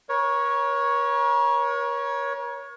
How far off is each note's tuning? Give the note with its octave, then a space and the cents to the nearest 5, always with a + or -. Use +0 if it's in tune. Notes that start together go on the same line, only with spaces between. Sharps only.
A#4 +40 C#5 +0